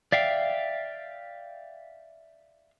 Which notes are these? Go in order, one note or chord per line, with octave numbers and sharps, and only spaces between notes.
D5 E5 F5 G5